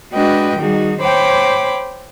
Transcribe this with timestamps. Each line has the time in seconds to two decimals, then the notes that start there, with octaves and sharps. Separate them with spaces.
0.13 G#3 D4 F#4 B4 D#5 G5
0.58 D#3 G3 D#4 F#4 G#4
1.00 C5 C#5 G5 B5 D6